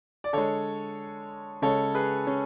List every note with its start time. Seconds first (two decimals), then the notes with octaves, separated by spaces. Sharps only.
0.24 D5
0.33 D3 G#3 A4 C#5
1.62 C#3 G#3 A4 C#5
1.95 G#4 B4
2.27 C#4